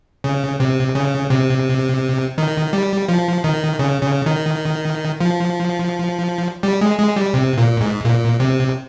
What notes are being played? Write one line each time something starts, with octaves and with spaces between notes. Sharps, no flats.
C#3
C3
C#3
C3
D#3
G3
F3
D#3
C#3
C#3
D#3
F3
G3
G#3
G#3
G3
C3
A#2
G#2
A#2
C3